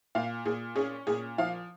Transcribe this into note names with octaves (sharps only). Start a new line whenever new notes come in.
A#2 F5
A#2 G#4
C#4 G#4
A#2 G#4
F3 F5